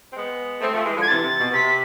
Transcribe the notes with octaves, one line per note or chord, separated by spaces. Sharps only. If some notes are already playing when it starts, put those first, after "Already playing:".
C4
G#3 B3
A3 C4
F3 A3
E3 G#3
D3 F3
G#6
C3 E3 A6
C3
B2
B2
C3 B6